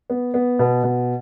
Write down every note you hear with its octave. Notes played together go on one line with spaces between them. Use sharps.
B3
B3
B2
B2